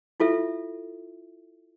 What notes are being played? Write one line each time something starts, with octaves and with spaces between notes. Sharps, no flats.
E4 F4 A4 E5